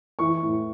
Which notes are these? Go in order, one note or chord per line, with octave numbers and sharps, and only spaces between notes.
E3 C#6
A2